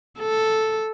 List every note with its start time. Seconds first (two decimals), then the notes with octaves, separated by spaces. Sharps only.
0.20 A4